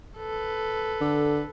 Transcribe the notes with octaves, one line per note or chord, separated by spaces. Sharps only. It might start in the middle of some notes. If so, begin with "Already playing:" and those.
A4 B4
D3